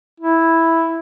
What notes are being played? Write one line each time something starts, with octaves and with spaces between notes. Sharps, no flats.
E4